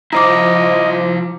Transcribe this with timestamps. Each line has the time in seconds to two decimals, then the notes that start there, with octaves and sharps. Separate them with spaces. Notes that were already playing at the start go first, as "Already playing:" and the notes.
0.13 F3 E4 C5 D#5 A#5 D6